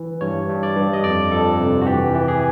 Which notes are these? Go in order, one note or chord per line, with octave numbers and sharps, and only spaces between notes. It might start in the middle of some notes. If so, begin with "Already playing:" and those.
Already playing: E3
G2 C#5
G2
D5
G2
D#5
F2 D5
F2 A4
C3
F#4
E3 G4
E3
G#4